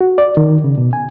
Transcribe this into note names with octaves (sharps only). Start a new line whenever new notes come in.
F#4
D5
D#3
C#3
B2
G#5